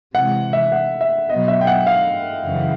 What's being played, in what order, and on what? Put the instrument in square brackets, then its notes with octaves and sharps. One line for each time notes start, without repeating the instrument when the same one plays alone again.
[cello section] C3 E3 G#3 [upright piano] F#5
[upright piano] E5
F#5
E5
[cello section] B2 F#3 B3 [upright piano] D#5
[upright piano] E5
G5
F#5
F5
[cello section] F#2 C#3 E3